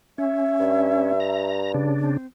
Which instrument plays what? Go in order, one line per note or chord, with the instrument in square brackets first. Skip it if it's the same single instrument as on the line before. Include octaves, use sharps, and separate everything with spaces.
[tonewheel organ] C#4 [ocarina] E5
[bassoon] G2
[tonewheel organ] A#5
C#3 D4
[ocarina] C4